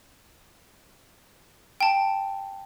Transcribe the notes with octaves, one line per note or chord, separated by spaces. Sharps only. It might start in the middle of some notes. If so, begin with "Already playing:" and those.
G5 A5